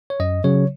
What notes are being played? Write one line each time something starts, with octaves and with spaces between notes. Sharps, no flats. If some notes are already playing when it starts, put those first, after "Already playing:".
C#5
F#2 D#5
C#3 F#3 C#5